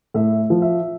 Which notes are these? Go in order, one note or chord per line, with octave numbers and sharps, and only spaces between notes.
A2 E5
F3
E5